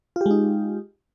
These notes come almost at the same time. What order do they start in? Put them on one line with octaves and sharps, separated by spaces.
F4 G4 G#3 D#4